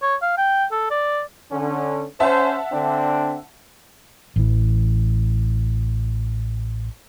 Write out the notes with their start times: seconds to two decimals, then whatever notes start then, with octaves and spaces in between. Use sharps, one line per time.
0.02 C#5
0.22 F5
0.37 G5
0.71 A4
0.90 D5
1.52 D3 C#4
2.20 C#4 C5 E5 F#5 A5
2.72 D3 C4 D4
4.36 A1 E3